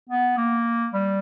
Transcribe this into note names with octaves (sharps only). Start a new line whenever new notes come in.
B3
A#3
G3